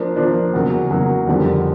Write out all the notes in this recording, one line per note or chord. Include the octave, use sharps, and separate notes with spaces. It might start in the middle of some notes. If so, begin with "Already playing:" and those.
Already playing: F3 A#3 D4
F3 A#3 D4
E2 C#3 F#3 A#3
E2 C#3 F#3 A#3
F2 D3 G3 A#3